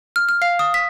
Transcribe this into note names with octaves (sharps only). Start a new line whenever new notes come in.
F6
F6
F5
D#6
B6